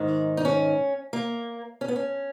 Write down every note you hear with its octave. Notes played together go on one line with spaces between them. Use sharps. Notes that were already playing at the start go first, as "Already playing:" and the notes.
Already playing: G#2 D#3
D#4
C#4
A#3
C#4
B3
C#4